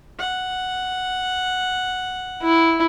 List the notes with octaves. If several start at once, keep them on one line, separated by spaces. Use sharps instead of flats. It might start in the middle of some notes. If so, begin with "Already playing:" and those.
F#5
E4